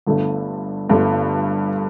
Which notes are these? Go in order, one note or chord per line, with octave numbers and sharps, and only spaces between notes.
G1 G2 D3 A3
G1 G2 D3 A3